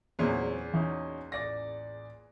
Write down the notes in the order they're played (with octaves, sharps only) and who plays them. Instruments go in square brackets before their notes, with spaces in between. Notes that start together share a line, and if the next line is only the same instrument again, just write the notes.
[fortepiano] E2 A#2 C#3 [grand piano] F#3 C4 C#4
[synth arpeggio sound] E3 [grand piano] C#4 D#4 F#4
[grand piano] A1 D5 A#6